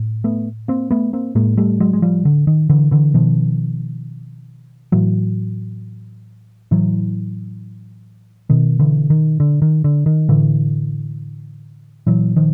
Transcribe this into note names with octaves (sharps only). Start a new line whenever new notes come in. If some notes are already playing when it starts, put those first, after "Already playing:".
Already playing: A2
A3 B3
A#3 C4
A3 B3
A#3 C4
A2 G#3 A#3
G3 A3
F#3 G#3
G#3
F3 G3
D3
D#3
D3 E3
D3 E3
B2 D#3 F3
A2 E3 F#3
A2 E3 F#3
B2 D#3
D3 E3
D#3
D3
D#3
D3
D#3
A2 D3 E3
A#2 E3 F#3
D#3 F3